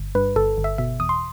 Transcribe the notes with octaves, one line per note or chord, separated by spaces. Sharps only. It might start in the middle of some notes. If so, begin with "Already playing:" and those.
Already playing: G1
G2 B4
G1 A4
G1
E5
B2 E5
E2 D#6
C6